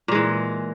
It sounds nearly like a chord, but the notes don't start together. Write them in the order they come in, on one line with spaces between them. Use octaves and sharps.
A#2 G#3 E3